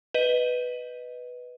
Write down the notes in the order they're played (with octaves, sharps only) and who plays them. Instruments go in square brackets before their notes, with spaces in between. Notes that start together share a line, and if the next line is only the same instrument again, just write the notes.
[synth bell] B4 D#5 D#7